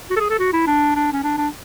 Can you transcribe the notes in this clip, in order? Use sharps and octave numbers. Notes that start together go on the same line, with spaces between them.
F#4
A4
G#4
A4
F#4
E4
D4
D4
C#4
D4
D4